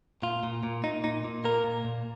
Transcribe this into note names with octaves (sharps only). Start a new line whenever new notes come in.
A#2 F4
A#2
A#2
A#2 D#4
A#2 D#4
A#2
A#3 A#4
A#2
A#2